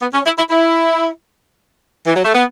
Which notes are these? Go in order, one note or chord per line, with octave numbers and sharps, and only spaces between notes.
B3
C#4
E4
E4
E4
E3
F#3
A3
B3